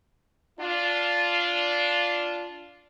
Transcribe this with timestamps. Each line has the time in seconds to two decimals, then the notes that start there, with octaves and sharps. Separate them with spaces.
0.58 D4 F4